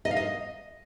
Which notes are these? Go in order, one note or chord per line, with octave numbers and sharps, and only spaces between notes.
D#5
F5
D#5